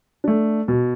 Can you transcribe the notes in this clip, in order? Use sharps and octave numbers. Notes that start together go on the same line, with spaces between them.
A3 D4
B2